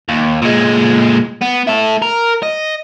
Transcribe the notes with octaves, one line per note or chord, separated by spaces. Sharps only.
D#2
A#2 G#3
B3
E4 A4
A#4
D#5